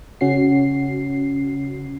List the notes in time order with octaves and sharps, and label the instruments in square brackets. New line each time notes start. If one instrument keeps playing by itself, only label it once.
[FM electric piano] C#3 C#4 F#4 C7